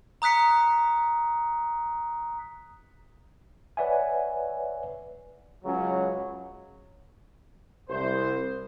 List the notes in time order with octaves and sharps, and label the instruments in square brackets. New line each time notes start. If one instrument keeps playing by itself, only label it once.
[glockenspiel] A#5 D#6 F#6 B6 C#7
[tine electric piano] B4 C#5 D5 E5 F#5 G#5
[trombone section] C#2 C#3 F#3
[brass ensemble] C2 C5